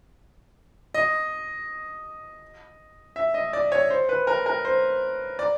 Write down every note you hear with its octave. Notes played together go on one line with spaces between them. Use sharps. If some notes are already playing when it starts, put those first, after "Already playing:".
D#5
E5
D#5
D5
C#5
C5
B4
A#4
A#4
C5
D5